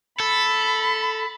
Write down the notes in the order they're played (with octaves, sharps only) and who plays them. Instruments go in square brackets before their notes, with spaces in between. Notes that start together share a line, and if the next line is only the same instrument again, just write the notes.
[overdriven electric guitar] A4 [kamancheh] B5